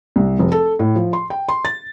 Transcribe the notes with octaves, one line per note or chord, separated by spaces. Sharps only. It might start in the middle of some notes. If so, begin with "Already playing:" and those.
C2
F1
A4
A2
F3
C6
G5
C6
A6